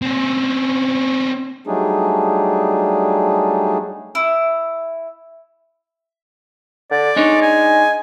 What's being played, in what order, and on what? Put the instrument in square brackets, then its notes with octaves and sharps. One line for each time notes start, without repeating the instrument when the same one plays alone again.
[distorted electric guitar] C4 C#4
[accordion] F#3 G3 A3 D4 D#4 G#4
[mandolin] E4
[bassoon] D3 [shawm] D5
[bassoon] G#3 [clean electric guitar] D4 D#4 C#5
[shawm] G#5